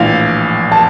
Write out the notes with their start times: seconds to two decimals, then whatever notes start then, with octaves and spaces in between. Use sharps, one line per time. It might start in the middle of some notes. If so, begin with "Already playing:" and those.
Already playing: A#1 A2 E3 F5
0.72 A5